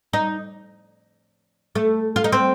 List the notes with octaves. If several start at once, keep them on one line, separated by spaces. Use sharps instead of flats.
D#4
A3
F4
D#4
C4